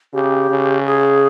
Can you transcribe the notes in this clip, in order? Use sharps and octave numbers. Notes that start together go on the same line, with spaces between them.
C#3 G4
C#3
G#4